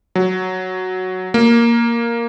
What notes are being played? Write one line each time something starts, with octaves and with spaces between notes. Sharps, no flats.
F#3
A#3